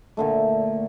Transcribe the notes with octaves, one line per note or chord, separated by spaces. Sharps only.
A#2 D3 A3